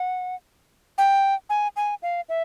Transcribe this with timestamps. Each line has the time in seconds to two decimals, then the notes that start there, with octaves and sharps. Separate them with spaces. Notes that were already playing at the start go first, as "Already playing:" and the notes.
Already playing: F#5
0.98 G5
1.50 G#5
1.76 G#5
2.03 F5
2.29 E5